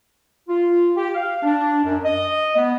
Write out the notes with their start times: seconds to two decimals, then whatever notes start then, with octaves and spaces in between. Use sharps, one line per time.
0.48 F4
0.96 G4
1.15 F5
1.42 D4
1.84 F#2
2.03 D#5
2.56 B3